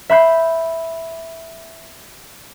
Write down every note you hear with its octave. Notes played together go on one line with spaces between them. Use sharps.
E5 B5 G6 C7